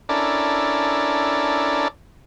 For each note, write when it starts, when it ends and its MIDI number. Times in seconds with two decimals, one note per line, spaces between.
0.09 1.88 61
0.09 1.88 62
0.09 1.88 64
0.09 1.88 69
0.09 1.88 70
0.09 1.88 74